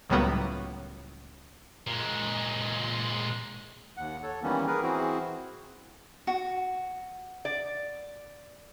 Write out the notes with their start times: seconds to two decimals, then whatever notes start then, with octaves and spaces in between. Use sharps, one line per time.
0.10 C#2 A2 F#3 G3 A#3 B3
1.87 A#2 G#3
3.97 D#2 F#5
4.23 A4 C#5
4.43 D#3 E3 G3 A#3 B3 C#4
4.67 G#4 A#4 B4
4.83 E3 C4 E4 F#4 G#4
6.27 F#4
7.45 D5